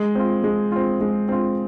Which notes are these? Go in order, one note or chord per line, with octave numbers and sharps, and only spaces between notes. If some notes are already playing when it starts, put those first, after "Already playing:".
Already playing: G#3
C4 F4
G#3
C4 F4
G#3
C4 F4